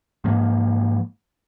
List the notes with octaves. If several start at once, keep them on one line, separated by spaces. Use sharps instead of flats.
G#2 F3 A#3